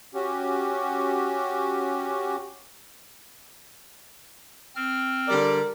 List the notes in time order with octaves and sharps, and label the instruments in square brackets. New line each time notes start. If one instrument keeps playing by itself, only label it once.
[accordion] C#4 F#4 G4
[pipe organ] C4 F6
[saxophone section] D3 G3 D5 [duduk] A#4